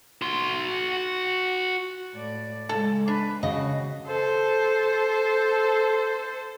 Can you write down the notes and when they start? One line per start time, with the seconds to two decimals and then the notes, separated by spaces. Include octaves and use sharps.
0.22 F#4 C6
2.14 A2 D5
2.69 C#3 G#3 A4
3.08 D4 B4
3.43 C#3 F#4 D#5
4.07 A4 C5